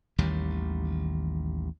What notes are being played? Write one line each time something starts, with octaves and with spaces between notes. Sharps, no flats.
A1 D#2 D#3 G3